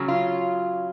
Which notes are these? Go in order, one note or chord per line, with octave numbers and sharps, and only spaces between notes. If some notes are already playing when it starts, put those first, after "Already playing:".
Already playing: C#3 F#3 C#4
F4